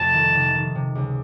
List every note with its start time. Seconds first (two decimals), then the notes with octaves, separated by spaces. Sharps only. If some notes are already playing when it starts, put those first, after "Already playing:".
Already playing: F2 C3 A3 A5
0.14 D#3
0.34 C3
0.54 D#3
0.75 C3
0.95 C#2